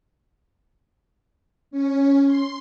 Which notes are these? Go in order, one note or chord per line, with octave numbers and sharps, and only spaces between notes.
C#4
C6